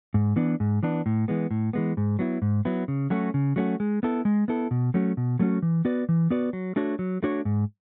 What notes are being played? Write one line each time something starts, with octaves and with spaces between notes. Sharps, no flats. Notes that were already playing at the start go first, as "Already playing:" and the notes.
G#2
E3 B3 D4
G#2
E3 B3 D4
A2
E3 G#3 B3
A2
E3 G#3 B3
G#2
F#3 B3 E4
G#2
F#3 B3 E4
C#3
F#3 A3 C#4 F#4
C#3
F#3 A3 C#4 F#4
G#3
B3 E4 A4
G#3
B3 E4 A4
B2
F#3 A3 C#4 F#4
B2
F#3 A3 C#4 F#4
E3
B3 F#4 B4 D5
E3
B3 F#4 B4 D5
F#3
A3 D4 F#4 C#5
F#3
A3 D4 F#4 C#5
G#2